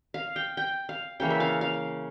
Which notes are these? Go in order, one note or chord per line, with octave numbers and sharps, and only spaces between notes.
F5
G5
G5
F5
C#3 E3 A#3 G5
E5
F5
F5